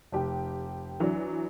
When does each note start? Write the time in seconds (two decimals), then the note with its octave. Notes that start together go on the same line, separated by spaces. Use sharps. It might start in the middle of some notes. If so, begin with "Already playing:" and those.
0.12 F1 G4
1.00 E3 F#3 D4